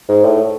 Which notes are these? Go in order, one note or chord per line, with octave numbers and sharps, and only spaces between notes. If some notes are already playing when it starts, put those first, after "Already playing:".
G#2
A2